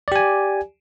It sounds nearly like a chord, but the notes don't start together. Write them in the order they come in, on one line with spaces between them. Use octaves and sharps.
D5 G4 G#5